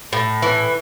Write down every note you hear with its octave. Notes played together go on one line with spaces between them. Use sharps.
A2
E3